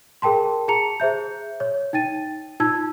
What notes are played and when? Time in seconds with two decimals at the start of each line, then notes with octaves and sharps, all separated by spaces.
0.22 G#4 A#4 G5 A5 C6
0.68 G#4 A5 A#5 C#7 F7
1.00 G#4 C5 E5 G6
1.60 C#5
1.93 D#4 G5 A6 D#7
2.60 D#4 F4 A5 E6 G#6